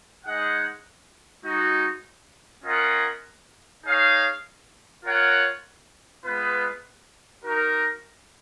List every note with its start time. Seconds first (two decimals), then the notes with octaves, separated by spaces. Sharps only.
0.25 G#3 D#4 G#4 D#5 F#5
1.44 G#3 D#4 F#4
2.64 C#4 F4 A#4 D#5 F#5
3.84 D#4 G#4 C#5 F5
5.04 F4 A#4 C#5 F#5
6.24 G#3 B3 F4 B4
7.44 D#4 F#4 A#4